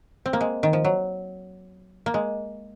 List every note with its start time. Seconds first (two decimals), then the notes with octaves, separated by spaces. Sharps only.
0.26 C4
0.33 A#3
0.41 G#3
0.63 D#3
0.73 F3
0.84 F#3
2.06 A#3
2.14 G#3